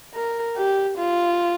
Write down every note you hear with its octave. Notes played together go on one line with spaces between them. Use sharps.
A#4
G4
F4